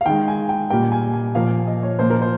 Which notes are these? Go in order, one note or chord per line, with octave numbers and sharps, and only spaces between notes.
F5
D#3 G#3 G5
G#5
G5
A#2 G3 A#3 G5
G#5
G#5
A#2 F3 A#3 F5
D#5
C#5
A#2 F3 A#3 C5
A#4
C5